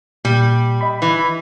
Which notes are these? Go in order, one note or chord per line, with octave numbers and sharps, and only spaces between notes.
A#2 G3
D#5 B5
E3